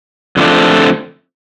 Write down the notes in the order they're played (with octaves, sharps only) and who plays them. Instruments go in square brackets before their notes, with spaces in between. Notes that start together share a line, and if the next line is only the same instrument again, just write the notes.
[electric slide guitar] F2 D3 F3 A3 D4